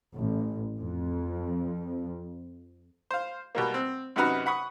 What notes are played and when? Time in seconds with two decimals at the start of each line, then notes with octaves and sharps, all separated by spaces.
0.14 A1
0.77 F2
3.11 C5 F5
3.55 B2 G3 A#3
3.74 C4
4.16 F#2 C3 D#4 F#4 B4 F6
4.46 F#5 B5 C#6 D#6